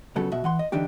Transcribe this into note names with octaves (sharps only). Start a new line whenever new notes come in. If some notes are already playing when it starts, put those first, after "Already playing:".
F2 C#3 F#3 B3 A4
B2 F#4 E5
E3 F#5 C6
D#5
D3 E3 D4 D#4 G4